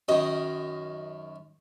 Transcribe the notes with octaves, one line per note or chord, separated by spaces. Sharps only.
F#2 D#3 D#5